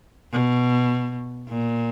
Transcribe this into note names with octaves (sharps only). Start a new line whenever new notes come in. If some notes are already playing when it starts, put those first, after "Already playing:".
B2
A#2